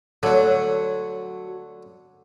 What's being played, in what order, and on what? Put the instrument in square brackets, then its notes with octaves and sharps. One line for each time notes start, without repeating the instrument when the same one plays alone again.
[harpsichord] D3 A3 [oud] F#3